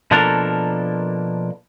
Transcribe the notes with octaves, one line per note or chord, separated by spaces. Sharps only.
B2 F3 A#3 D4 A4 A#4